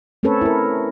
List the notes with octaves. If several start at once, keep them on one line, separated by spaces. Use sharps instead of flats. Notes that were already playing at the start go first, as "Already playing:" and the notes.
A3 C4 C#4 A4 B4 C#5
E4 A#4